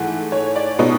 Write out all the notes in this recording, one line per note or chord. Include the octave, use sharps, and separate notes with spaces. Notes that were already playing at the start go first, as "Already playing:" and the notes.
Already playing: G#2 E3 A3 F#5
C#5
D5
B2 G#3 B3 D#4